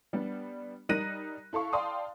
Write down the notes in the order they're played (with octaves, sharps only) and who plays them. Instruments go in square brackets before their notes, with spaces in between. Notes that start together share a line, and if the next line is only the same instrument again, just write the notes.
[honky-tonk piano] G3 B3 D4
G3 D#4 A#4 F#6 A#6 D#7
E4 A4 F5 C#6
D5 F5 G5 A5 C6 D#6